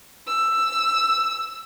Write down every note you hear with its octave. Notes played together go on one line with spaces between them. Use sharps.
E6